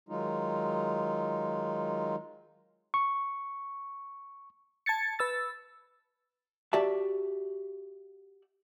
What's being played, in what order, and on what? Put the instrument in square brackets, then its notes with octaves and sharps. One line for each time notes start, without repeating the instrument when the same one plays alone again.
[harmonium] D#3 F#3 G#3 D#4 F4
[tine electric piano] C#6
[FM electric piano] A5 G#6 A6 C#7
B4 E6 A6
[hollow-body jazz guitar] F#4 G4 D5 E5 A5